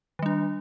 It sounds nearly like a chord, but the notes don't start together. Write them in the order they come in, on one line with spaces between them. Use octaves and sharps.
D#3 G3 D4